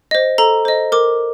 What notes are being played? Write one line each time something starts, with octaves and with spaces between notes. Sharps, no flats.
C5 D#5
A4 A#5
C5 D#5
A#4 D6